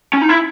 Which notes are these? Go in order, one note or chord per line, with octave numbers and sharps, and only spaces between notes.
C#4
D#4
E4